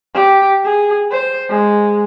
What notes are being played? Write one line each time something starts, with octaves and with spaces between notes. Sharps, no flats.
G4
G#4
C5
G#3